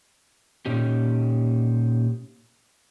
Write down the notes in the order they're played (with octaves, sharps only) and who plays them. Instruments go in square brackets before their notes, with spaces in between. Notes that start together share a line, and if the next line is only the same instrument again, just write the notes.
[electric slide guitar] A#2 C#4 D#4 G4